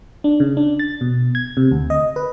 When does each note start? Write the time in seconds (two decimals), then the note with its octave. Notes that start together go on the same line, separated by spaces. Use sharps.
0.24 D4
0.40 C#3
0.57 D4
0.79 A6
1.01 B2
1.35 G#6
1.57 C3
1.71 D2
1.90 D#5
2.16 B4